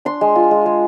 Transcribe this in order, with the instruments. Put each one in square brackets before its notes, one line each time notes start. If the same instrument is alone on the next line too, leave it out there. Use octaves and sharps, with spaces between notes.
[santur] D4 C6
G#3
F4
G#3
G#3